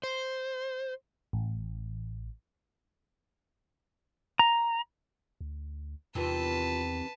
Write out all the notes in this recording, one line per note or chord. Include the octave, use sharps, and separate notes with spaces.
C5
A1
A#5
D2
E2 C3 D#3 E3 F4 B4 A5